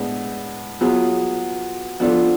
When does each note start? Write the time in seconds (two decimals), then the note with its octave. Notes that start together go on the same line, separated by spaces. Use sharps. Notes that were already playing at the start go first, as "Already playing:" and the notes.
Already playing: A2 G#3 B3 D4
0.81 F#3 B3 F4 G#4
2.00 F3 B3 D4 F4 A4